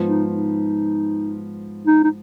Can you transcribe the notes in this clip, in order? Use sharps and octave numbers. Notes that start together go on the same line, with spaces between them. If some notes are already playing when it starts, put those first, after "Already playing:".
Already playing: G#2 F3 B3
D#4
D#4
D#4
D#4